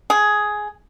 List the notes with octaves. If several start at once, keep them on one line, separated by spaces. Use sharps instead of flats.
G#4